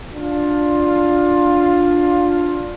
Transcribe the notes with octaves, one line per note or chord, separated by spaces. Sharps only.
D4 F4